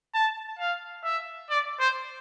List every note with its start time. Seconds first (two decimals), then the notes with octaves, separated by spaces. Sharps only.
0.14 A5
0.59 F5
1.04 E5
1.50 D5
1.80 C5